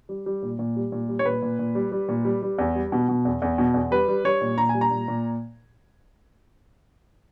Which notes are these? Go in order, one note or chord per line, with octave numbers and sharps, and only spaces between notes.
G3
G3
A#2
A#2
G3
A#2
G3
C#5
A#2 B4
A#2
A#2
G3
G3
A#2
G3
G3
E2
G3
B2
B2
E2
E2
B2
E2
G3 B4
G3
G3 C#5
A#2
A#2 A#5
G#5
G3
A#5
A#2
A#2